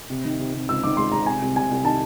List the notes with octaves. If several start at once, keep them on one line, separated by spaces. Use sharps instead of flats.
C3
D#3
C3
C3
C#2 E6
D#3 D6
G#3 C6
G#3 A#5
C3 G#5
C2
C3 G#5
C2
D#3 A5